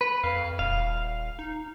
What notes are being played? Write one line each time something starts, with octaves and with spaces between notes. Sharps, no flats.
B4
F2 F5
D#1 F5
D#4